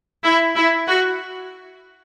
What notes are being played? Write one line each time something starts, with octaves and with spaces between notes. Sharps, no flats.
E4
E4
F#4